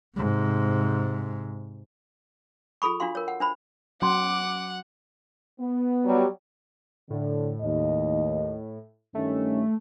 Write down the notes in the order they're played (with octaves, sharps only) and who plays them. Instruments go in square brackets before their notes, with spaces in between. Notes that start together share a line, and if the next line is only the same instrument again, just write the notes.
[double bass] G#2 C3
[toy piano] F4 G#4 A4 B5 C#6
D4 F4 F#4 F5 C6
A#4 C#5
F#5
D4 C5 B5
[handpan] F#3 [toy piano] C#4 C6 [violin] F#5 [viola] D6
[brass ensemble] B3
[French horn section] F#3 G3
[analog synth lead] A2 [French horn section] D3
[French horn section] D#2 D#5
[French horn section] G2 D#3 C#4 [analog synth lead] A3